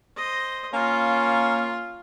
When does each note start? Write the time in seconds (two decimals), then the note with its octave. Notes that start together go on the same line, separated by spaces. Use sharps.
0.16 C5 D#5
0.73 A#3 C#4 F4